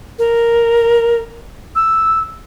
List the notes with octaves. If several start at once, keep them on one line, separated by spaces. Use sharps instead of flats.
A#4
E6